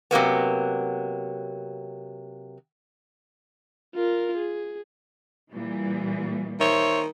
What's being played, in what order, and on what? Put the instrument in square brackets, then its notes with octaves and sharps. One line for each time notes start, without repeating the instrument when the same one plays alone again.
[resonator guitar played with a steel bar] C3 F#3 A#3 B3
[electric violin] F4 A#4
G#4
[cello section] A#2 E3 G3
[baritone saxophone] D#3 [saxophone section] C5 C#5 E5